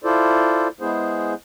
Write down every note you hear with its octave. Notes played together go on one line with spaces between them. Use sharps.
E4 F4 A4 C5 D5
G#3 B3 E4 G#4 C5